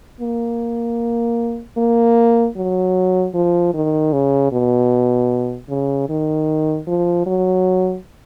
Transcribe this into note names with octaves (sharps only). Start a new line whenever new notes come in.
A#3
A#3
F#3
F3
D#3
C#3
B2
C#3
D#3
F3
F#3